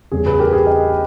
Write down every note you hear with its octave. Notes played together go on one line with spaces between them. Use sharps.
E2 C#3 G3 C#4 G#4
G#4 B4
G4 A#4
G#4
D#5 G5